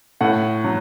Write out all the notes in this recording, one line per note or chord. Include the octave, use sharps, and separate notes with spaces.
A2 F#5
F#3